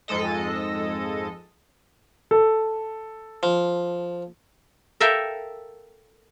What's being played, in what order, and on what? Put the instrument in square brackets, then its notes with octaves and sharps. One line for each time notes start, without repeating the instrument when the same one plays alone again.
[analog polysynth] F2 G#2 G#3 A4 D#5
[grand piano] A4
[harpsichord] F3
[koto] A4 A#4 E5 F5 G5